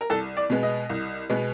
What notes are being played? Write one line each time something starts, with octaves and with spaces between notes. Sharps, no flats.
A#4
C2 A4
D5
B2 G#3 B3
D#5
C2
B2 G#3 B3